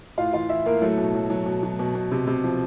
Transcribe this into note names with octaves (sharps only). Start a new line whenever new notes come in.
A2 F4 F5
E3 F4 F5
E3 E4 E5
A2 A#3 A#4
F#3 A3 A4
B2
F#3
F#3
B2
F#3
B2
B2
C3
C3
F3